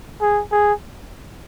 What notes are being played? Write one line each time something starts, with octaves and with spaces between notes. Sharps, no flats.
G#4
G#4